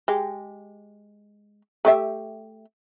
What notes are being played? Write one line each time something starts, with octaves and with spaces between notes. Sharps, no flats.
G#3 G4
A3 G4 E5